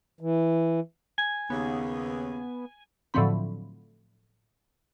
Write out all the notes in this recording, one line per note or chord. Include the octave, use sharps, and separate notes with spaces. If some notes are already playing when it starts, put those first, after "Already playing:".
E3
G#5
D#2 C#3 B3
A2 D3 F3 F#3 C4 B5